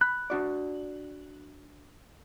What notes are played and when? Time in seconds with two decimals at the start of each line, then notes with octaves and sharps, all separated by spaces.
0.01 B5 F#6
0.30 D4 F#4 D5